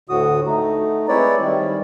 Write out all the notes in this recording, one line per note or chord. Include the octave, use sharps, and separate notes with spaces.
D2 A2 D3 F#4 D#6
A3 D#4
G#3 C4 E4 B4 C#5 D5
D#3 G3